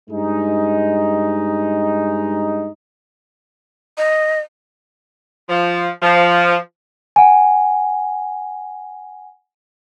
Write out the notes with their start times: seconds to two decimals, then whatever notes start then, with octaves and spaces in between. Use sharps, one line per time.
0.10 G2 G#3 D#4
3.98 D#5
5.49 F3
6.02 F3
7.16 F#5 G#5